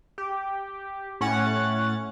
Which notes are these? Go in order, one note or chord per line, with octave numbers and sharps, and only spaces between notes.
G4
A2 C#4 C#5 F#5 A6